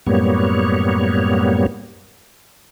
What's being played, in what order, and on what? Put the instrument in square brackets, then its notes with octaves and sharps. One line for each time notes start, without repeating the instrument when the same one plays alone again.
[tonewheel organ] F#2 A2 G3 A#3 B3 C#5